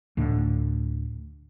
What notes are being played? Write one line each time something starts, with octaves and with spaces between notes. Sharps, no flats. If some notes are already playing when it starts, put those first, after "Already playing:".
D2 A2 D3